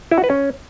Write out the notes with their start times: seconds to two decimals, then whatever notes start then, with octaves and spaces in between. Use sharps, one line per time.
0.11 E4
0.18 F#4
0.24 B4
0.30 C#4